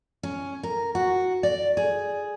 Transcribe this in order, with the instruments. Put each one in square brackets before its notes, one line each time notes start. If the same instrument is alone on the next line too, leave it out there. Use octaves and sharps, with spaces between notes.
[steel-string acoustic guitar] C#4
A#4
F#4
D5
G#4